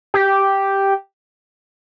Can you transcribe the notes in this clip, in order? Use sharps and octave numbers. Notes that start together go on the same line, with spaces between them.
G4